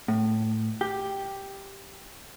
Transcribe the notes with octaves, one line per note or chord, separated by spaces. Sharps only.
A2
G4